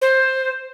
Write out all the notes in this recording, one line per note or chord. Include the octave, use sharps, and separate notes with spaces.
C5